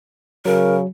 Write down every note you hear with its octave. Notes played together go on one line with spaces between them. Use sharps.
C#3 F#3 A#4